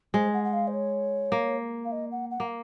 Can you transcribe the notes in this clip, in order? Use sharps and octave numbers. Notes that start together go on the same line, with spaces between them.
G#3 C5
F#5
F#5
F5
C5
C#5
A#3
F5
D#5
F#5
F#5
A#3